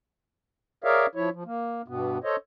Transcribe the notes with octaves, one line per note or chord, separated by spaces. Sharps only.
G#4 A#4 C#5 D5 E5 F5
F3 E4 C#5
F3
A#3
G2 B2 B3
A4 C5 C#5 D#5